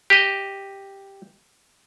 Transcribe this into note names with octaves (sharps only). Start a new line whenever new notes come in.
G4 D#5